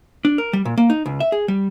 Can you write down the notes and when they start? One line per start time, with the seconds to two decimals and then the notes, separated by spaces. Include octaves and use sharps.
0.25 D4
0.38 A#4
0.53 G3
0.65 A#2
0.77 A#3
0.90 D#4
1.06 C#2
1.20 E5
1.32 G#4
1.48 G3